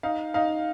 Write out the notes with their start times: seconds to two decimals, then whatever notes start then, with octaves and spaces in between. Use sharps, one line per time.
0.03 D#4 F5
0.34 D#4 F5